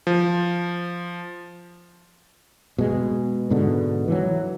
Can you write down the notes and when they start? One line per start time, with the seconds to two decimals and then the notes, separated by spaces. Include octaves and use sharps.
0.07 F3
2.78 B2 G#3
3.50 G#2 B2 D3
4.08 E3 F#3